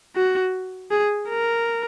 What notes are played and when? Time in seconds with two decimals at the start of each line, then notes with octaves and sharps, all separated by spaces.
0.16 F#4
0.91 G#4
1.29 A#4